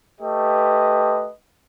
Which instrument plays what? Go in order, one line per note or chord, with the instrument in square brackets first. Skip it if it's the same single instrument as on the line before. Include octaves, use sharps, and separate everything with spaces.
[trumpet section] A3 G4 B4 D#5